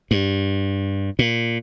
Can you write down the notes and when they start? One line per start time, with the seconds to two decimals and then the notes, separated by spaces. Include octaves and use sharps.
0.11 G2
1.19 A#2